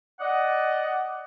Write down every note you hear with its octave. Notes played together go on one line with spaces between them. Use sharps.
D5 D#5 F#5